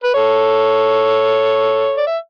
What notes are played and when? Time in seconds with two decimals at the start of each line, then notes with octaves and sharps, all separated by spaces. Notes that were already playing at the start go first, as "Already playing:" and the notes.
0.04 B4
0.14 A4 C#5
1.97 D5
2.07 E5